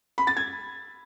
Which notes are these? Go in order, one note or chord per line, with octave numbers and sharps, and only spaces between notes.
B5
A6
G#6